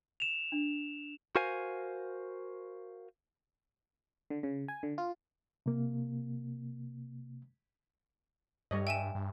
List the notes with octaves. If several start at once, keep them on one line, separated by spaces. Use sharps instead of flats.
E7 F7
D4
F#4 A#4 C5 F5 G#5
D3
C#3
G#5
D3
F4
C3 A#3
G2 G3 C#5 D#5
E5 G5 G#5 E7
G2